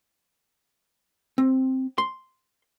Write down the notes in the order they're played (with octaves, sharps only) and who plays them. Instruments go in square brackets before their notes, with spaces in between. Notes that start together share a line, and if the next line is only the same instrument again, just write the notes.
[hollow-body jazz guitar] C4
C6